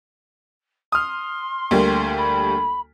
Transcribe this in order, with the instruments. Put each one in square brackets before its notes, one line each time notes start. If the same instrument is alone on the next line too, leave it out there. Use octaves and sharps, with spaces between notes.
[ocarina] C6 [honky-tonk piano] D#6 F6
[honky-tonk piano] D2 G3 A#3
[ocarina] B5